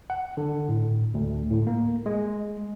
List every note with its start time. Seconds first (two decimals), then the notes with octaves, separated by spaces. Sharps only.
0.10 F#5
0.37 D3
0.69 A2
1.14 D2
1.51 A2
1.67 A#3
2.06 G#3